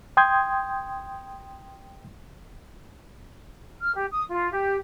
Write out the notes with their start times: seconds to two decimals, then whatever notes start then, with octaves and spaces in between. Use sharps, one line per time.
0.17 G5 C6 D#6 G6 G#6
3.80 F6
3.94 G4
4.11 D#6
4.28 F4
4.51 G4